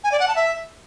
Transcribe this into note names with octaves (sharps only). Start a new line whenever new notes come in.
G#5
D5
F#5
A5
E5